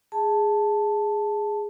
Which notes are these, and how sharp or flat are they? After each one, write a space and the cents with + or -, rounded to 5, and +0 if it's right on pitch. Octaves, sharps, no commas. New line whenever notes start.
G#4 +0 A5 +0